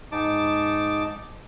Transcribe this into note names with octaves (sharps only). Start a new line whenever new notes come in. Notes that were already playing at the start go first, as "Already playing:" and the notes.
G#2 D#4 A5 D6